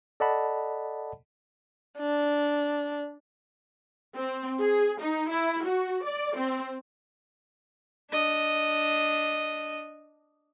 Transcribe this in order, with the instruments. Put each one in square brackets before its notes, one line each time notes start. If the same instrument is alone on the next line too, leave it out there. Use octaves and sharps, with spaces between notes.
[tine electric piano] A4 D5 D#5 F#5 A5 B5
[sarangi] D4
[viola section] C4
G#4
D#4
E4
F#4
D5
C4
[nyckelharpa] D4 D#5